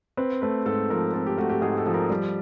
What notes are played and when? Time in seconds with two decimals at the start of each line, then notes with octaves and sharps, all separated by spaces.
0.17 C4 B4
0.42 A3 B4
0.66 G#2 A4
0.90 F3 A#4
1.14 C4 A4
1.26 G4
1.38 A3 F#4
1.50 G4
1.61 G#2 G#4
1.78 A4
1.86 F3
1.94 A#4
2.10 G3